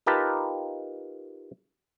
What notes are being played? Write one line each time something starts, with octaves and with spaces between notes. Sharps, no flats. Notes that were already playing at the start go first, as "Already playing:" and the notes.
D#4 F4 G4 A#4 B4 A5